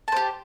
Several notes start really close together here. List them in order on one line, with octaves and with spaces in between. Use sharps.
A5 C5 G4